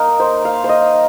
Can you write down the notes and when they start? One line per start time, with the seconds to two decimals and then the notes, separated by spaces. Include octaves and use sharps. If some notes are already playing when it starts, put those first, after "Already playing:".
Already playing: A#3 D#4 A#4
0.20 C5
0.45 F5
0.64 C5
0.69 D#5